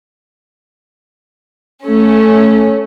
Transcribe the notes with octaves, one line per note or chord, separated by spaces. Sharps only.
A3 C#4